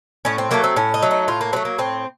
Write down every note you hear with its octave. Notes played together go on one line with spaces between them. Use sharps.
A2 C#4
C4
F#3 A3 A#3
C4
A2 C#4
D#4
F#3 A3
D#4
A2 F4
A#3
F#3 A3 C4
A#3
A2 C4